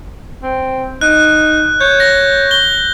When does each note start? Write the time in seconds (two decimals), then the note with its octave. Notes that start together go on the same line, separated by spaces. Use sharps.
0.42 C4
1.01 D#4 F#6
1.81 C#5 G6
2.00 A#6
2.51 G7